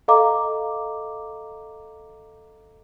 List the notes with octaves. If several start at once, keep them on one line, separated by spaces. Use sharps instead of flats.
A4 D#5 F5 A#5 D6